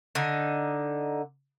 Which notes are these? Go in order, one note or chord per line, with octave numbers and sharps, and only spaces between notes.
D3 D#4